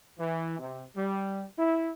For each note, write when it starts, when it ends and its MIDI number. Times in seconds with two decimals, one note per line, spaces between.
0.18 0.58 52
0.59 0.82 48
0.96 1.44 55
1.58 1.90 64